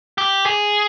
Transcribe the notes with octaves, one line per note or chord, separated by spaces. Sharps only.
G4
G#4